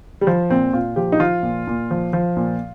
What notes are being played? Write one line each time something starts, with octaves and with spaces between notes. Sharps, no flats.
G3
F3
A#2 C4
A#2 F4
F3 G4
D#4
F3 F4
A#2
A#2
F3
F3
A#2